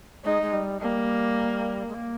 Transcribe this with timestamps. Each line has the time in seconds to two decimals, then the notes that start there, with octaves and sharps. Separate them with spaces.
0.24 G#3 D#4
0.42 G#3
0.53 G3
0.81 G3 A#3
1.88 G#3
1.94 A#3